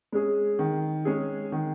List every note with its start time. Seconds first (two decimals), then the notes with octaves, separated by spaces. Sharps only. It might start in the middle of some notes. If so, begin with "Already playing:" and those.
0.12 G#3 C#4 G#4
0.59 D#3
1.05 G#3 C#4 G#4
1.52 D#3